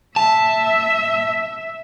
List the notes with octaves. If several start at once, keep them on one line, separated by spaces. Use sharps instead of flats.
E5 A5